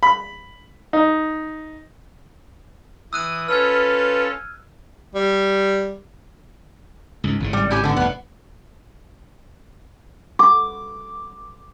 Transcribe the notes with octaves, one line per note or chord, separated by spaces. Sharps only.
B5
D#4
E3 D#6 E6 F#6 D#7
C#4 F4 A4 B4 F6 G#6
G3
C#2 G#2
G#1 A2 C#3
G3
E4 G4 G#5
D3 B3
F1 A2 B3
D6